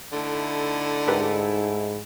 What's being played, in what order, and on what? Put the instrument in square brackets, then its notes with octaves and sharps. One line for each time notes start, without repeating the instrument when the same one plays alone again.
[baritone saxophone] D3 [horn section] A3 D#4 E4
[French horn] G#2 [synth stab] G4 A#4 B4